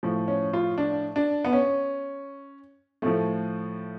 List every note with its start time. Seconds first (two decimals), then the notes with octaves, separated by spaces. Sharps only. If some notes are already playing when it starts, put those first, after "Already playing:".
0.03 A2 F3
0.28 C#4
0.53 F4
0.78 D4
1.16 D4
1.44 B3
1.53 C#4
3.02 A2 F3 A3